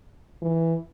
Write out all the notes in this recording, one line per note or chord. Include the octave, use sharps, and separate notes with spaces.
E3